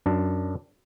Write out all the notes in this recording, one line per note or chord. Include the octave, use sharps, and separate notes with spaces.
F#2 D4 D5